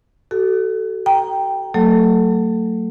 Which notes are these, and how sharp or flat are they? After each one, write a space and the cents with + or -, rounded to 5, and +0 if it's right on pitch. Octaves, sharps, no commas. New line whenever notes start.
F#4 +40 A4 +0
G5 +0 A#5 +10
F#3 +0 A3 +35 A4 +0